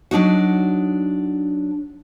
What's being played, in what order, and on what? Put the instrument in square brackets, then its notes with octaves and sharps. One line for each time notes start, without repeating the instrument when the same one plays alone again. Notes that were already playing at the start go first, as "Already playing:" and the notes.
[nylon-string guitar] F#3 D4 D#4 F#4